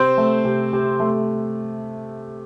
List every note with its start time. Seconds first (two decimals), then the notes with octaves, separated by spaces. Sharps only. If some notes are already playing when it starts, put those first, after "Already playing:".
Already playing: C3 C4 C5
0.18 A3
0.45 C3
0.73 C3
1.00 A3